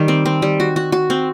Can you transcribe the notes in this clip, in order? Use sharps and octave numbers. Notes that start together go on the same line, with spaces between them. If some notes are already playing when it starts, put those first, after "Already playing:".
Already playing: D#3 G3
C4
C4
G3
F#4
F#4
F#4
C4